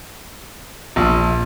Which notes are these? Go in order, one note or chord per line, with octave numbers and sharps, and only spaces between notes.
A#1